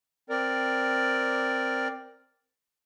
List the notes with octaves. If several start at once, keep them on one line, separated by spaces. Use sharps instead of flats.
C4 A#4 D5